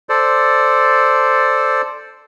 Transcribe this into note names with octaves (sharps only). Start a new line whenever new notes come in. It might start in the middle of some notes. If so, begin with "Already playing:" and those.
A4 C5 D5